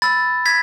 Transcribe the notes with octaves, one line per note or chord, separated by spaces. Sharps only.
B5 E6 A6
G#6 B6